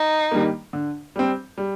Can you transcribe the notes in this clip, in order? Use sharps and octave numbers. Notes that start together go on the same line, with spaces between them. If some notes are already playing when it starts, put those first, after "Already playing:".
Already playing: D#4
D#3 G3 A#3
D3
G3 C4
G3